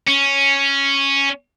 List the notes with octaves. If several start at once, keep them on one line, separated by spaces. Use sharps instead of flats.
C#4